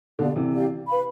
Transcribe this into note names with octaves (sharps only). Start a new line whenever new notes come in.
B2 D3 G4 D5 F5
C3 E3
G4 D5 F5
B4 F5 B5